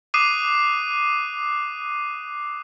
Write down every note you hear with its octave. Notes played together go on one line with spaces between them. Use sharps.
D6 D#6 F#6 C7 D#7